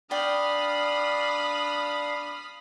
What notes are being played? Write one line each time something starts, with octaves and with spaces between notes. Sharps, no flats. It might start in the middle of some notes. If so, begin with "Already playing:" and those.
D4 D5 F5 G5 B5 D#6 F6